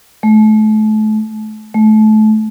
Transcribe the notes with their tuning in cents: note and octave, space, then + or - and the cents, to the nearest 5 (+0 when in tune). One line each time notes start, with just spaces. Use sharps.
A3 -35
A3 -30